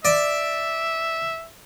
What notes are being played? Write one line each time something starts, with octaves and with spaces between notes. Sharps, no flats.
D5 E5